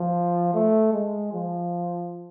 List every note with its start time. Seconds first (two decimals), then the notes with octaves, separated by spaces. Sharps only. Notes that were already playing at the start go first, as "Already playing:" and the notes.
Already playing: F3
0.54 A3
0.93 G#3
1.33 F3